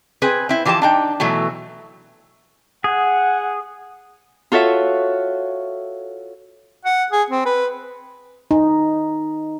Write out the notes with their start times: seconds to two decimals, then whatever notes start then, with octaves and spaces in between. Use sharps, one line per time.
0.22 C4 G#4 B4 G#5
0.49 C4 E4
0.65 E3 F3 G4 C5 A5
0.82 D4 D#4 G5
1.20 B2 E3 F#3 A3
2.84 G#4 F#5
4.52 F4 F#4 A4 C#5 E5
6.85 F#5
7.12 G#4
7.30 C4
7.45 B4
8.51 D#4